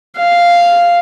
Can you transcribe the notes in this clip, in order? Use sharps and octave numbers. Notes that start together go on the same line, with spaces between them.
F5